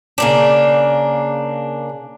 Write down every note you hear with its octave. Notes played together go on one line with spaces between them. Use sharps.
C#3 A#3 D4